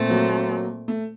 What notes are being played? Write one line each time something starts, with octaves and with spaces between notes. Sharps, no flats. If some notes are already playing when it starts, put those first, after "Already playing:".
Already playing: A#2 A3 C4
F#3 A#3
A3